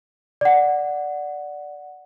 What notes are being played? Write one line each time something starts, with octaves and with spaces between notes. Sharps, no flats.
D5 F#5